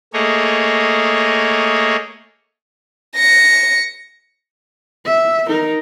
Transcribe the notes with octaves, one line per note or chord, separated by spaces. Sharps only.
A3 A#3 G#4 C#5 D#5
A#6 C#7
E5
D#4 A#4